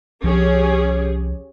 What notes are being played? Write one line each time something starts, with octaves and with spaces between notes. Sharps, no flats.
C2 F3 C#4 G4 G#4